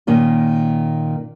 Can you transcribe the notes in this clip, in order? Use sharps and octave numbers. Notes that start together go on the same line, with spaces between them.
A#2 D#3 A#3 C#4